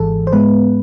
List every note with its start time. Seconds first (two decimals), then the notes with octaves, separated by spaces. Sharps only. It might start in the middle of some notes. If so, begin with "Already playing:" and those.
Already playing: G#1 G#2 E3 G#4 A4
0.27 C5
0.33 G#2 G#3 B3 B4